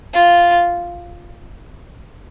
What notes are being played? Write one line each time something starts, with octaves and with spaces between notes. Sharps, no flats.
F4